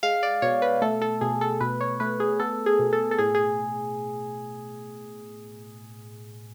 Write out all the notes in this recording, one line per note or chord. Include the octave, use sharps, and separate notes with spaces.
G#3 F5
D5
B2 C#5
B4
A3 A4
A4
B2 G#4
A4
B2 B4
C#5
A3 B4
G#4
B3 A4
G#4
B2
A4
A4
A2 G#4
G#4